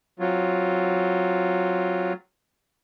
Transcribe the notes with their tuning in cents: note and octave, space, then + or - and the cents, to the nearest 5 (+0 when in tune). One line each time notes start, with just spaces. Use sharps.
F#3 +0 C4 +0 F4 +0